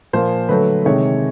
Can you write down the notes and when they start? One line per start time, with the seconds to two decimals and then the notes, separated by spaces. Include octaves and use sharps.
0.13 A#2 F3 A#3 C5
0.49 D3 F#3 A3 B4
0.85 C3 D#3 G#3 C#5